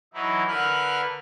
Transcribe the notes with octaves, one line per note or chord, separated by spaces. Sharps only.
E3 F#3 D#4 E4
D3 A#4 B4 F6 F#6